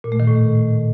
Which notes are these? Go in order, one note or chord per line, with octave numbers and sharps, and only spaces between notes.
A#2
A3
D#3
A2